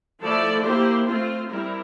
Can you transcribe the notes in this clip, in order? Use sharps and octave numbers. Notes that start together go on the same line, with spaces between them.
F3 A3 E4 A4 D5
A#3 E4 G4 C5
A3 C4 F4 C5
G3 C4 E4 A#4